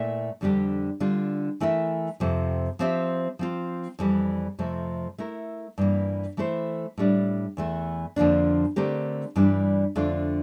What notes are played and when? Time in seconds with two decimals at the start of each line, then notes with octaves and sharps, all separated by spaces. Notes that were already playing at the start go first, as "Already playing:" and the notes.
Already playing: A#2 A3 E4 A#4 E5
0.41 F2 D3 G3 D4 G4
1.00 D3 G3 D4 F4
1.60 E3 A3 E4 A#4 E5
2.20 F2 C3 F3
2.79 F3 C4 G4 C5 E5
3.39 F3 C4 F4
3.99 F2 E3 G3
4.59 F2 C3 F3 A3
5.18 A3 E4 A#4
5.78 G2 E3 A#3
6.37 E3 A3 E4 A4 C5
6.98 A2 G3 D4
7.57 E2 E3 A3
8.16 F2 D3 F3 A#3 D4
8.76 D3 A3 C4 G4 A#4
9.36 G2 E3 G3 D4
9.96 F2 D3 A3 D4 F4